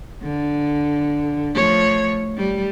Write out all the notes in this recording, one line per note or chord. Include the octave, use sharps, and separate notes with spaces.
D3
F3 A3 C#5
G3